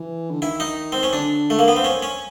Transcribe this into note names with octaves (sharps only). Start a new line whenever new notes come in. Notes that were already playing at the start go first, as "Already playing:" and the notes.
Already playing: E3
D3
D#3 E4
D#4
C4
C#4
D3 D4
A3
A#3
B3
C4
C#4
C#4